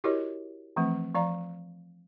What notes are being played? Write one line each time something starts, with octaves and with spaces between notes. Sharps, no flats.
E4 F#4 G4 A#4 C#5 D#5
E3 F3 A3 C4
F3 D5 F5 A#5